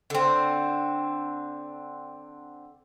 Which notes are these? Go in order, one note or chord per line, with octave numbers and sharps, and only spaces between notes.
D3 C4